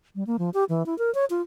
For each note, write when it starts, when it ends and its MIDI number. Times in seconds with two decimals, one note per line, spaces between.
0.15 0.24 55
0.27 0.37 58
0.39 0.50 53
0.54 0.64 67
0.69 0.86 52
0.86 0.97 64
0.99 1.13 70
1.15 1.25 73
1.30 1.42 65